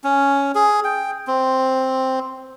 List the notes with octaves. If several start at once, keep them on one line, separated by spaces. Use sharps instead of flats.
C#4
G#4
G5
C4